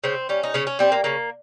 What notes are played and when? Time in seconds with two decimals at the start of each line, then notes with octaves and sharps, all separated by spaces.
0.04 C#3 C4
0.29 G3 C#4
0.43 D#4
0.54 C#3 C#4
0.67 C#4
0.79 G3 C4
0.92 A#3
1.04 C#3 A#3